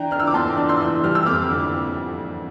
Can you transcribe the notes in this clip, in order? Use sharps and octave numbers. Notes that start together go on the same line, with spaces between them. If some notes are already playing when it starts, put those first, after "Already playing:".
Already playing: E3 D4 G5 A#5
D4 F6
E6
D6
E2 A5 C6
D4
C6 E6
E3
G3 F6
E6
F2 D6 F6
D3